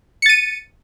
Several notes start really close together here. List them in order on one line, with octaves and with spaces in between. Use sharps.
C#7 A6 D#7